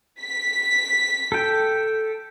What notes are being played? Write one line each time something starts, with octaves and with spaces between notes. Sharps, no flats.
B6
A4 G5